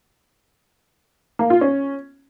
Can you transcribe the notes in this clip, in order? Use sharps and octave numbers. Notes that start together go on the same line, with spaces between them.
A#3
F4
C#4